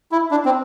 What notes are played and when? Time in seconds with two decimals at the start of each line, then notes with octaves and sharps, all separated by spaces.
0.12 E4
0.31 D4
0.45 C4